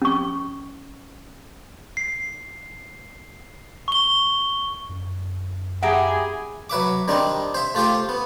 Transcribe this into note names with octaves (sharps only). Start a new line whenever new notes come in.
C#4 C#6
C7
C#6 G7
F#2
E4 G4 G#4 F#5 A#5
F#3 B4 E5 D6
D#3 G3 C4 D4 D#4
C5 E5
A3 F4 G4 C5
B3